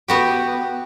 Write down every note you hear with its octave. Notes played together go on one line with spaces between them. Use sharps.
B3 F#4 G4